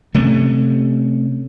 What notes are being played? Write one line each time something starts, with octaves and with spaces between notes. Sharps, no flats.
C3 A3 C#4